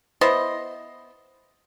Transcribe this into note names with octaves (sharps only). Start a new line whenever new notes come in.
B3 E4 C5 D#5